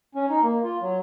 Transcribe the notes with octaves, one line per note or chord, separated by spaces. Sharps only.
C#4
D#4
A#3
F4
F#3